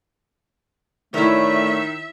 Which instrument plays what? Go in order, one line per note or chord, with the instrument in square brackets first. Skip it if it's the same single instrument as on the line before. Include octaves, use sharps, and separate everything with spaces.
[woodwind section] A2 D3 A3 [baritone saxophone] D#3 [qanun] E4 C#5 [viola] E5